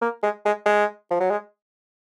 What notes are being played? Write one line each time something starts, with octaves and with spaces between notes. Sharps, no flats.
A#3
G#3
G#3
G#3
F3
F#3
G#3